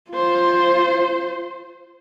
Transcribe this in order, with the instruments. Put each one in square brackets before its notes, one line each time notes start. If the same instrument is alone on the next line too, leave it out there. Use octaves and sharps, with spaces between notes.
[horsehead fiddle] F4 C5